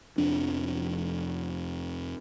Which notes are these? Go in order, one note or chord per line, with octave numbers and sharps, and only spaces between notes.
F1 F2 F3 D4